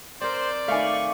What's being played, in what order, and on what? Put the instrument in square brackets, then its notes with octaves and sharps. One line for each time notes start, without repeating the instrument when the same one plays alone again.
[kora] C4 A#4 [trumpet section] C5 [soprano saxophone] D5
[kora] D#3 A3 [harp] F5 G#5 D6 [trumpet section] B5 C#6